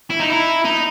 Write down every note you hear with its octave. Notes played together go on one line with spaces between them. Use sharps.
E4
D#4
E4
D#4